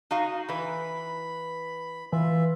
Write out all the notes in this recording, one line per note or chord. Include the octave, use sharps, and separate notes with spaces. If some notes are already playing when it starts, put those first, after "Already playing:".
D#4 F#4 F5
E3 B4 B5
E3 F4 E5